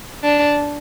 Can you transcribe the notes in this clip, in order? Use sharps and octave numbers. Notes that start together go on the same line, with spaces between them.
D4